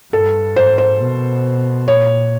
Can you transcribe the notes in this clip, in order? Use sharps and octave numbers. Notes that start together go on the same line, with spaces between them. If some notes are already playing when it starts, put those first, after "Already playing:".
G2 A4
G#2 C5
C5
B2
A#2 C#5